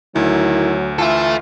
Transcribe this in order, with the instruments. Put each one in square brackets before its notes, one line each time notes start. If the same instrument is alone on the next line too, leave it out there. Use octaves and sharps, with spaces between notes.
[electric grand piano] D2 [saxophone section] D#3 E4 [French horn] F#3
[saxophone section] E3 F4 [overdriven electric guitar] A4 E5